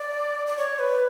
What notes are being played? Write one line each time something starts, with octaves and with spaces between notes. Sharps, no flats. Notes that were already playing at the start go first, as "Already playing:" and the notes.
Already playing: D5
D5
C#5
B4